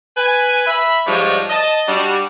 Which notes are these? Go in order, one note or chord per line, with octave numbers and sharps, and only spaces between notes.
B4 G#5
E5 B5
G#2 F3 G3 D4 C#5 D#5
D#5 A5
G3 D4 F#4